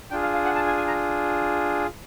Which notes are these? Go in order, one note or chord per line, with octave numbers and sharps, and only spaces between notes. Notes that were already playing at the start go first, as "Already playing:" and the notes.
D4 F4 G#4 G5
F5
F5
F#5
A5
G#5
G#5
A#5